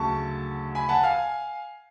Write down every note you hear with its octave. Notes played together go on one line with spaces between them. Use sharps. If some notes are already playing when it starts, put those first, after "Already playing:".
Already playing: D2 C#3 F#3 A5 C#6
G#5 B5
F#5 A5
F5 G#5